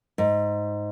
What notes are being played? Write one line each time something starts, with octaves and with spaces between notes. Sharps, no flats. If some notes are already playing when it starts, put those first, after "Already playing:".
G#2